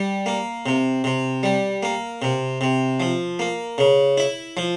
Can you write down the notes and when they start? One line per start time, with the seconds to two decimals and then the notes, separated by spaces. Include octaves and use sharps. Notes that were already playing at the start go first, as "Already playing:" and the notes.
Already playing: G3
0.26 A#3
0.66 C3
1.04 C3
1.43 G3
1.83 A#3
2.22 C3
2.61 C3
3.00 F3
3.39 A#3
3.78 C#3
4.18 E4
4.57 F3